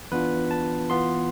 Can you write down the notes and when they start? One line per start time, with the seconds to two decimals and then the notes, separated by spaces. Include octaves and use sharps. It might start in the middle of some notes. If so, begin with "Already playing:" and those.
0.12 E3 B3 D4 F4 B4
0.51 A5
0.90 E3 B3 F4 C6